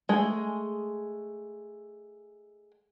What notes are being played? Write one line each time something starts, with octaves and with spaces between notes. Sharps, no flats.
G#3 A3 G#4